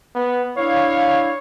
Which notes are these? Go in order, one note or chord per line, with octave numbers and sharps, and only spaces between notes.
B3
D4 E4 C#5 F5